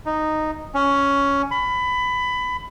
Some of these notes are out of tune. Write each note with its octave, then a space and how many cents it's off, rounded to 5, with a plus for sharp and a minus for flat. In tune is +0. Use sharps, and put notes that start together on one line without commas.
D#4 -5
C#4 +10
B5 +20